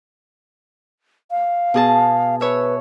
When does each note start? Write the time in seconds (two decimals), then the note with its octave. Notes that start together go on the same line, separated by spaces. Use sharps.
1.31 F5
1.74 B2 G#4 A5
2.41 B4 C#5 E5